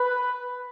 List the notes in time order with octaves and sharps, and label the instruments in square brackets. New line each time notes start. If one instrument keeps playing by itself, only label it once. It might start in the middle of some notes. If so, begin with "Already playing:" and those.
Already playing: [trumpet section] B4